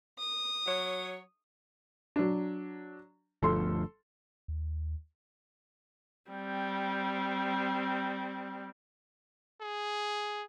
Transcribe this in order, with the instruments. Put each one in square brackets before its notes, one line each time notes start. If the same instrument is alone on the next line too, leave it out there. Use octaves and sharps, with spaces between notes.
[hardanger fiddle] D#6
[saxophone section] F#3 C#5
[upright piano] F#3 D4
[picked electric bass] G1 D2 F3 [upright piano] A4 C6
[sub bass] D#2
[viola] G3 C4
[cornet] G#4